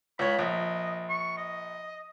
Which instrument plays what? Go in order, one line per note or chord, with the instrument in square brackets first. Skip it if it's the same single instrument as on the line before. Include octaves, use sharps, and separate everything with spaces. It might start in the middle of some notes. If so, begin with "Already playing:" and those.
[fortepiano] C#2 C#5 [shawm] B5
[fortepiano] A#1 [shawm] D#5
[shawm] C#6
D#5